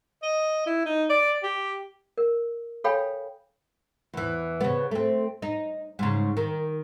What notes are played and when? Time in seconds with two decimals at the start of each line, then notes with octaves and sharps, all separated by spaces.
0.23 D#5
0.66 E4
0.85 D#4
1.10 D5
1.43 G4
2.18 A#4
2.84 A4 C#5 F5 G5 G#5 B5
4.14 E2 E3
4.61 C#3 B3
4.91 A3 C4
5.42 D#4
5.99 G#2 C#3
6.37 D#3